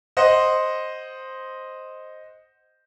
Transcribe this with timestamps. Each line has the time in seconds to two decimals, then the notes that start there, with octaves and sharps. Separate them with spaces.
0.17 C5 D#5 F#5 C6